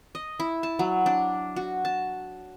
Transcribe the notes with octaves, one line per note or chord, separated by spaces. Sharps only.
D#5
E4
A5
F#3
D4
F#4
A5